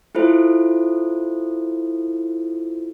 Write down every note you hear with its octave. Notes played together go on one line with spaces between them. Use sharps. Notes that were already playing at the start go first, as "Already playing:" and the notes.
E4 F4 A4 C5